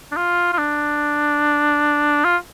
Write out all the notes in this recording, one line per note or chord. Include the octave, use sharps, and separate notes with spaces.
D4
F4
F4
D4
F4